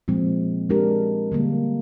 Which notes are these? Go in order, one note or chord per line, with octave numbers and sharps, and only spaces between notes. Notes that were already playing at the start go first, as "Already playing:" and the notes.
A#2 F3 G#3 C4
G#3 D4 G4 A#4
D3 G3 A#3